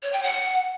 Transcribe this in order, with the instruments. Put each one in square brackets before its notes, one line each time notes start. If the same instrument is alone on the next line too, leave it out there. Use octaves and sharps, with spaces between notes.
[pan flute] C#5
G5
F#5